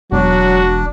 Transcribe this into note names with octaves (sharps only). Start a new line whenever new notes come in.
E1 F#3 D4 F#4